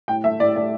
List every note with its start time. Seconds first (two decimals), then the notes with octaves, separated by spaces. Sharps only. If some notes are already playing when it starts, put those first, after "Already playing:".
0.08 A2 G5
0.24 A3 E5
0.40 A2 D5
0.56 A3 D5